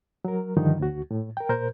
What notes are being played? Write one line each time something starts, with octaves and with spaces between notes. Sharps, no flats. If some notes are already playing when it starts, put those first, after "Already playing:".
F#3 A#4
G2 D3 D#3 F3 D#4
D2 F#4
A2
A#4 G5
A#2 A#4 C5 G6